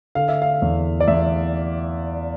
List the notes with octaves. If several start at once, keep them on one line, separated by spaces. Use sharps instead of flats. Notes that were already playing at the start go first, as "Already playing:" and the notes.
D3 F5
E5
F5
E2
D5
E2 E5